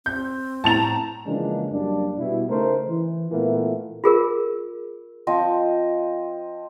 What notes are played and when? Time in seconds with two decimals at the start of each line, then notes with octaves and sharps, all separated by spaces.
0.06 C4 G6
0.64 A2 A5 A#5 A6 F7
1.26 C#3 E3 F3 G#3 A#3 D4
1.70 F#2 G3 A#3 D4
2.18 B2 G3 E4
2.49 C#3 A3 D#4 A#4 C5
2.89 E3
3.31 A#2 E3 A3 B3 F4 A#4
4.04 F4 G#4 A#4
5.27 F3 C4 D#5